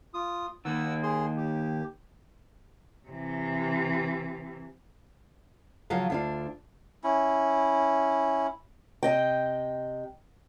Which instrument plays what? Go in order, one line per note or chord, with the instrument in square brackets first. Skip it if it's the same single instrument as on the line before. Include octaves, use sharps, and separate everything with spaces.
[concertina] F4 D#6
[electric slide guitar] D#3 A#3 [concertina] F#5 E6
[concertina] G#4 C6
G4
[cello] C3 E3
[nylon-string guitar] C#3 F3 F#3 F5
D2 D4 F4
[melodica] C#4 E4
[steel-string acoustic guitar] C3 D#5 G5